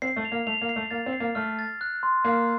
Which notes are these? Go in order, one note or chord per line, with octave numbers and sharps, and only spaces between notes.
C4 C7
A3
F7
A#3
A3 F7
A#3
C7
A3
A#3 A6
C4
C7
A#3
A3 F6
A6
F#6
C6
A#3 C7